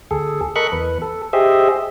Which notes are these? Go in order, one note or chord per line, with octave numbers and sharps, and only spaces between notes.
D2 G#4 A4
A4 A#4 D#5 B5 C#6 F#6
E2 B4
A4
G4 G#4 C5 D#5 E5